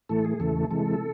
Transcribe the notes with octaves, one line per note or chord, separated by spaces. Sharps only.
A2 E3 A3 A4
G#4
E2 C#3 E3 A3 A4
C3 E3 G#3 A4